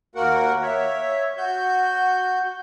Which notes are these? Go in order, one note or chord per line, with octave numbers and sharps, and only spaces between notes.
D#2 A#3 F#4 A#4 F#5
C#5 E5
F#4 G6